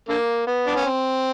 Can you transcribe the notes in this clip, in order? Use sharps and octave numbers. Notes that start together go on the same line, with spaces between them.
D3 A#3
B3
D4
C#4
C4